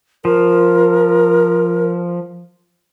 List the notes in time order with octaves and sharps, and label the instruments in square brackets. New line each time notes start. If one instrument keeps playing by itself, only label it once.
[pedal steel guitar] F3 [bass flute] A#4